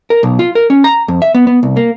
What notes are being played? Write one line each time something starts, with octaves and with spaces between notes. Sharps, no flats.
A#4
B1
F4
A#4
C#4
A#5
F2
E5
B3
B3
C2
A#3